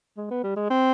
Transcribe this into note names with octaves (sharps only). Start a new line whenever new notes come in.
G#3
B3
G3
G#3
C4